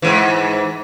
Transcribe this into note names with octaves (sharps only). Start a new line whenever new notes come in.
G#2 E3